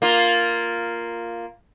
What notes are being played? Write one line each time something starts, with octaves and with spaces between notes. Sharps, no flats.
A#3 F4